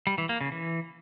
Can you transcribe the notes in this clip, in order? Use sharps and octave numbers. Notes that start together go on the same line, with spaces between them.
G3
E3
A#3
C#3
E3